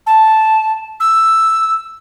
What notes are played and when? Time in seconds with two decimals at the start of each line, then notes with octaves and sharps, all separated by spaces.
0.07 A5
1.00 E6